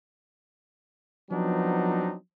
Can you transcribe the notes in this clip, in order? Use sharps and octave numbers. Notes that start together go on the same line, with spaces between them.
F3 F#3 B3 C4 D4 D#4